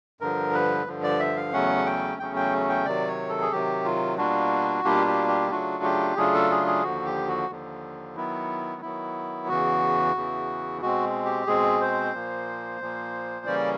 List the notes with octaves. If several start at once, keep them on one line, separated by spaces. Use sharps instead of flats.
G2 D3 F3 A#4
B4
G2 D3 F3
D5
E5
F5
E2 C#3 F#3 A3 C#4 F#5
G5
E2 C#3 F#3 A3 C#4 G5
G5
G5
C3 D#3 F#3 D5
C#5
A4
G#4
C3 D#3 F#3 G4
F4
B2 G3 A#3 D4 F4 F#4
B2 G3 A#3 D4 F4 G4
G4
G4
C#3 F#3 A3 D4 F4 F#4
G4
C#3 F#3 A3 D4 F4 G#4
A4
G#4
G#4
D#2 D3 F3 F#4
G4
F#4
D#2 D3 F3
D#3 F#3 B3 E4
D#3 F#3 B3 E4
E2 C#3 E3 F#4
E2 C#3 E3
B2 G#3 C4 F#4
G4
B2 G#3 C4 G#4
C5
A#2 F3 A#3
A#2 F3 A#3
C#3 E3 G3 A#3 C#4 D5